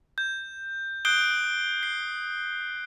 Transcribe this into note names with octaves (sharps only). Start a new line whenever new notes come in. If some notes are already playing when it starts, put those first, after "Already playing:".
G6
D#6 F#6 G6 C7 D7 G7
C7